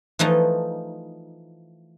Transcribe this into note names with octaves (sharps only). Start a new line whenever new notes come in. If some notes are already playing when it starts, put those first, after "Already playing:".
E3 F3 A3 D#4